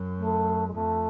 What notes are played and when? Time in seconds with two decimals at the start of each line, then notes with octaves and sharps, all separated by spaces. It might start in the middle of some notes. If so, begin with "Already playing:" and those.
Already playing: F#2
0.18 A3
0.68 G#3
0.74 F2 A3